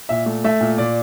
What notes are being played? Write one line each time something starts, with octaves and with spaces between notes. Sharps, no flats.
A#2 E5
A3
A3 E5
A#2
A#2 D5